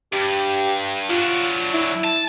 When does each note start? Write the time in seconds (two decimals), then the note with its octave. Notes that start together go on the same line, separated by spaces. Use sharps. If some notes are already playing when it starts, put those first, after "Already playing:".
0.13 G2 G4
1.10 F#3 D4 F4
1.74 E4
2.04 A5